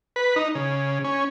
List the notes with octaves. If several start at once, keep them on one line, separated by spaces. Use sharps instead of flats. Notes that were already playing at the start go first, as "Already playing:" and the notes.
B4
D#4
C#3
C#4